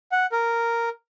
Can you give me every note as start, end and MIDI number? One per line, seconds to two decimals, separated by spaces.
0.12 0.26 78
0.32 0.89 70